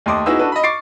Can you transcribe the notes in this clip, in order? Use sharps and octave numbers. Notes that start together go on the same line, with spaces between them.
D#2 A3 D#5 C6 D6 D#6
B3 D#4 E4 F#4 G#4 E6
D4 F#4 A4 B4
D#5 B5
C#6 D6 A6 C7 D7